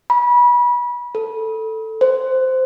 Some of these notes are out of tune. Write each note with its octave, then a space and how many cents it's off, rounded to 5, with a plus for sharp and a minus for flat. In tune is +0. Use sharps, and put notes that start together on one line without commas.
B5 -30
A4 +10
C5 -10